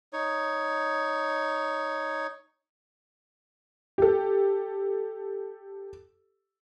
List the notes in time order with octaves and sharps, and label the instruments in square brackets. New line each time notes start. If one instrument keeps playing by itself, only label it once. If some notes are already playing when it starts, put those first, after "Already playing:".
[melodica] D#4 C#5
[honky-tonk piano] G4 A4